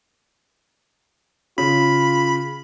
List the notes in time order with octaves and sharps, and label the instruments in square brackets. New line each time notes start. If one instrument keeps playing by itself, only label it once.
[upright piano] C#3 [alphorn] F4 [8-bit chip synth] B5